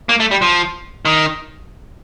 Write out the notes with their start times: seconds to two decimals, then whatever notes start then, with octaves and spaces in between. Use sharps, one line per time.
0.09 A#3
0.20 A3
0.31 G3
0.42 F3
1.05 D#3